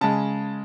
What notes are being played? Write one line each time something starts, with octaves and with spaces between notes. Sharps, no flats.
C#3 G#3 A5